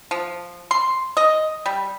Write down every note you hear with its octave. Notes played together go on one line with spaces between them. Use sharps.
F3
C6
D#5
G3